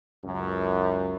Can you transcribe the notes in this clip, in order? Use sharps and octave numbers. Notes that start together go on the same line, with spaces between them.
C#2 F#2